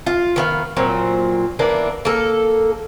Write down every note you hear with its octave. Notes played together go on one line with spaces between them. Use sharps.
F4
D#3 B3 F5
A#2 F#3 C4
E3 A#3 B3 D4
A#3 A4